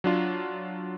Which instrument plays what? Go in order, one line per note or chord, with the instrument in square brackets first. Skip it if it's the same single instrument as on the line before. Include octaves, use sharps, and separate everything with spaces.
[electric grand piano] F#3 D4 F4